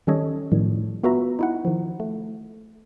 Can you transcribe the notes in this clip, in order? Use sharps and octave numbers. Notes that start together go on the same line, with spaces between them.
D#3 G3 C#4 A4 C#5 D#5
A2 D#3 F3 G3
B3 F4 F#4 B4 E5 A#5
D#4 E4 F#5
D#3 F3
A3